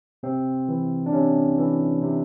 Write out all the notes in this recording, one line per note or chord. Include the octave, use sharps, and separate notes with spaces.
C3 C4
E3
D4
C3 C#4
E3
C3